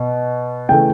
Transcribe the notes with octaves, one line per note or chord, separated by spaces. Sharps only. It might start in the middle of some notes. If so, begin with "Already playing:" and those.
Already playing: B2
C#3 E3 A3 G5